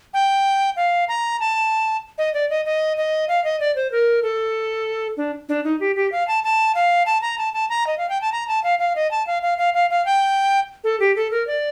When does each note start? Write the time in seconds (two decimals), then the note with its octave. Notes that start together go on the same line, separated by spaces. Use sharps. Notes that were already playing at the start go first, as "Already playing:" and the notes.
0.14 G5
0.76 F5
1.08 A#5
1.40 A5
2.18 D#5
2.34 D5
2.50 D#5
2.65 D#5
2.97 D#5
3.28 F5
3.44 D#5
3.60 D5
3.76 C5
3.92 A#4
4.23 A4
5.17 D4
5.49 D4
5.64 D#4
5.80 G4
5.96 G4
6.12 F5
6.28 A5
6.44 A5
6.75 F5
7.06 A5
7.22 A#5
7.38 A5
7.53 A5
7.69 A#5
7.87 D#5
7.98 F5
8.09 G5
8.21 A5
8.32 A#5
8.48 A5
8.64 F5
8.79 F5
8.96 D#5
9.11 A5
9.27 F5
9.43 F5
9.58 F5
9.74 F5
9.90 F5
10.06 G5
10.84 A4
11.00 G4
11.16 A4
11.31 A#4
11.47 D5